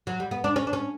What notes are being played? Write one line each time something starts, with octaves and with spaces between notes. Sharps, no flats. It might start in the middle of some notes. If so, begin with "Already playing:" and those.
F#3
G3
B3
D4
C#4
D4
C#4